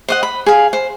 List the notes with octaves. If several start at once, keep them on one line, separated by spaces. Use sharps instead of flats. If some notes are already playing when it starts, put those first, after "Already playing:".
C5 D#5 F#5
B5
G#4 F5
C5